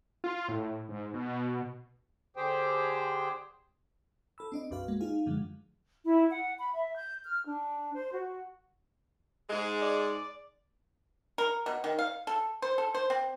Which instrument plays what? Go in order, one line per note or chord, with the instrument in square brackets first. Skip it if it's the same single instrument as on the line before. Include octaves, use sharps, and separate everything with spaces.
[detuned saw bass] F4
A2
G#2
B2
[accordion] D3 G4 G#4 C5 G5
[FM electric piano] A4 B5 E6
C4 D4 D#5
B1 F#2 F#4 B4 F5
G#3 A#3
D#4 F4 G#4 F5
F#2 D3 F3 F#3 G#3
[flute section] E4
F#5
B5
E5
G6
F6
D4
C5
F#4
[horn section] G#2 G#3
[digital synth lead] D5
[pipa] A#4
B2
D#3
F5
A4
C5
A4
C5
C4